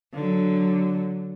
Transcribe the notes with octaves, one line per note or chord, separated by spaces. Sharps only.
D3 F#3